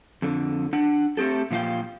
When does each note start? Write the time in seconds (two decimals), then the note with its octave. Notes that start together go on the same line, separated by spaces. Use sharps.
0.22 F2 D3
0.73 D4 F#5
1.17 A3 C4 G4 A4
1.51 A#2 F3 F4 F5 G5